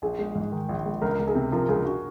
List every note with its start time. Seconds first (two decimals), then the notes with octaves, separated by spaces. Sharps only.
0.02 A#1 G#4
0.19 G#3
0.35 G#2
0.52 D#3
0.69 A#1
0.86 G#3
1.02 C#2 A#4
1.19 C#2
1.27 G#4
1.35 C3
1.52 F3 A#4
1.69 C#2 G#4
1.85 F#4